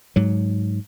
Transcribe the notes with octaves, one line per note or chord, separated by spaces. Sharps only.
G#2 F#3